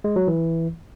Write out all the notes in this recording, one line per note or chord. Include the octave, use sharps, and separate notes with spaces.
G#3
F#3
E3